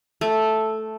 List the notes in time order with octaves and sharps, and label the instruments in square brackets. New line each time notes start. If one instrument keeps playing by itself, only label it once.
[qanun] A3